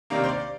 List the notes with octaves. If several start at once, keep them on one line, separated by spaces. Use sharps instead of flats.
C3 D#3 A#3 D4 F5
C5
D5